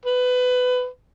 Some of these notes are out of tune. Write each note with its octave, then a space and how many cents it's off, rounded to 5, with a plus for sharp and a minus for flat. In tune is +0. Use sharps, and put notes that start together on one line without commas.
B4 +20